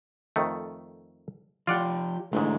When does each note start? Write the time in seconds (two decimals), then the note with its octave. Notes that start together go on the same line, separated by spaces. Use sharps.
0.36 F2 D#3 A3
1.67 F3 F4 G4 D5 F#5
2.33 A1 G#2 D3 G#3 A3